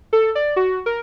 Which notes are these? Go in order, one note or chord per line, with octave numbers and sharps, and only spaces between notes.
A4
D5
F#4
A#4